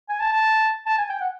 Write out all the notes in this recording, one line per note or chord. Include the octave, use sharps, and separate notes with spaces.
G#5
A5
A5
A5
G#5
G5
F#5